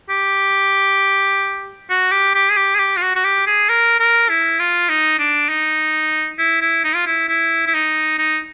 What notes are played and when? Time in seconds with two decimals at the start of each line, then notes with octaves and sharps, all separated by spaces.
0.09 G4
1.90 F#4
2.12 G4
2.34 G4
2.50 G#4
2.57 G4
2.75 G#4
2.79 G4
2.97 F4
3.02 F#4
3.15 F#4
3.25 G4
3.47 G#4
3.69 A#4
3.99 A#4
4.29 E4
4.59 F4
4.89 D#4
5.19 D4
5.49 D#4
6.38 E4
6.61 E4
6.84 D#4
6.95 F4
7.06 E4
7.28 E4
7.66 E4
7.74 D#4
8.18 D#4